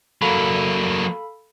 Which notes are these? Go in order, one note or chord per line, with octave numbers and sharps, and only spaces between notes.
F#3 A#3 A4 F5 B5